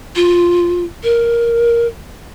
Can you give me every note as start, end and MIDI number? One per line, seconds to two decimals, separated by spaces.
0.16 0.84 65
1.03 1.86 70